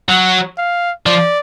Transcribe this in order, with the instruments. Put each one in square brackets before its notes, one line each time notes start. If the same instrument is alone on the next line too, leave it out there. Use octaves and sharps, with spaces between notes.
[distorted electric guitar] F#3 [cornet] F#5
[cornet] F5
[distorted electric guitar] F3 [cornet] D5